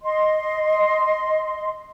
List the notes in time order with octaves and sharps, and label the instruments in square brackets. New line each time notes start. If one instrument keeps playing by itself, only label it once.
[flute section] D#5 C6